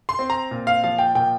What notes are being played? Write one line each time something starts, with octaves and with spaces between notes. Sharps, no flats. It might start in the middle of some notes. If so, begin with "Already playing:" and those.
C6
C4
A#5
A#2
F5
F3 F5
G5
A#2 G5